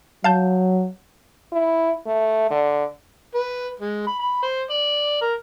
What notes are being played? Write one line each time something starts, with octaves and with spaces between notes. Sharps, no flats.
F#3 F5 A5 G6
E4
A3
D3
B4
G#3
B5
B5
C5
D5
A#4